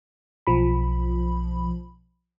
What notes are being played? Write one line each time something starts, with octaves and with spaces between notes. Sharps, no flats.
B1 F3 B5